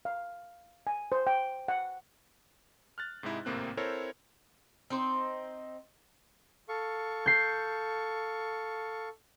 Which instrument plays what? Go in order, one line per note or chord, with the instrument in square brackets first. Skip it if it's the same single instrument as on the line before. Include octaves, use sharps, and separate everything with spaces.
[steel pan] F5
G#5
C5
G5
F#5
[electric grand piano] F6 F#6 A6
G#2 C3 G#3 D#4 E4
G#1 A2 C3 A#3 C4 F#6
C4 E4 A4 A#4 C5 C#5
[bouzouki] C4 D#4 C5
[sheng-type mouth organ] A4 F5 C#6
[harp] G6 C7